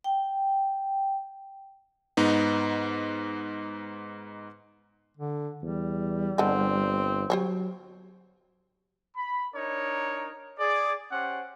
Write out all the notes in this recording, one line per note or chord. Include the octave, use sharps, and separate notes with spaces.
G5
G#2 B3 D#4
D3
E2 G3
G1 D3 G#3 C4
F#3 G4 C5 C#5
B5
D4 D#4 A#4 C#5
G#4 D5
C#4 G4 C5 F#5